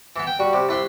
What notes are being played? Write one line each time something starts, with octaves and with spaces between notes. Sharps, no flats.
E3 B3
G5
G3 F#4
C3
C2 E4 B4 C6